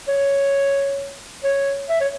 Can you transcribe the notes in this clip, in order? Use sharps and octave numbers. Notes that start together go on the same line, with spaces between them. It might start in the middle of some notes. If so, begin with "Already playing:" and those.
C#5
C#5
E5
C#5